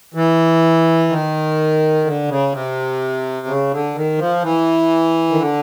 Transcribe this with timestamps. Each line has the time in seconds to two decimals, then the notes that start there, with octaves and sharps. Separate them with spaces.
0.14 E3
1.09 D#3
2.05 D3
2.28 C#3
2.52 C3
3.47 C#3
3.71 D3
3.95 D#3
4.18 F3
4.43 E3
5.31 D#3
5.38 D3